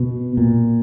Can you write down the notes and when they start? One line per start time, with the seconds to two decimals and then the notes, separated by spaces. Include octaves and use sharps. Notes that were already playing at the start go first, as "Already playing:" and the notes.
Already playing: B2
0.37 A#2